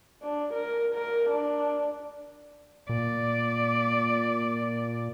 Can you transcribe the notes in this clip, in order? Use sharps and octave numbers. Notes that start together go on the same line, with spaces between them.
D4
A#4
A#4
D4
A#2 D5